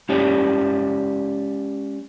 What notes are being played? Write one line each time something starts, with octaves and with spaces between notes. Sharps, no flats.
G#3 C#4 G4 C#5 D5